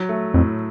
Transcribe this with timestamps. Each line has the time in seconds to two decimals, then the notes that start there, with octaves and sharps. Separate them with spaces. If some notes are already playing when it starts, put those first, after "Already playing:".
Already playing: F#3
0.09 A3
0.34 F2 A2